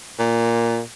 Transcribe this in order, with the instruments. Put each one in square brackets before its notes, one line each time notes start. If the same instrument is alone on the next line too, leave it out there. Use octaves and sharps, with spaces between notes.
[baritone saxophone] A#2